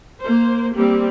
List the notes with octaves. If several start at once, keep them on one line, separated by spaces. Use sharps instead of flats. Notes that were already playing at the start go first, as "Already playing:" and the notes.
A#3 C5
G3 A#3 C4 G4